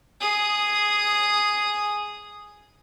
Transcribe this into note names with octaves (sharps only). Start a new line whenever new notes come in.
G#4 D#6